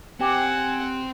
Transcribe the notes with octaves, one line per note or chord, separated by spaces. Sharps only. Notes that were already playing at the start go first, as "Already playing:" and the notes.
C4 G4 F#5 G#5